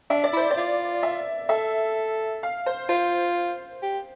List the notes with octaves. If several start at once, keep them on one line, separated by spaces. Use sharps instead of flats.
D4 E5
D5
E4 C5
D5
F4
E5
A4 E5
F5
C5
F4 C5
G4